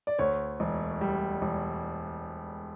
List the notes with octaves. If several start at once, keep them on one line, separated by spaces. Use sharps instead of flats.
D5
D2 C#5
E1
G3
E1